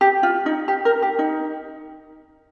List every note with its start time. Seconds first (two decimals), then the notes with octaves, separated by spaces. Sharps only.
0.01 G4
0.23 F4
0.46 D#4
0.68 G4
0.85 A#4
1.02 G4
1.19 D#4